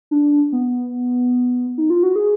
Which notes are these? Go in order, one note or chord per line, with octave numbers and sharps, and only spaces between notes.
D4
B3
D#4
F4
F#4
G#4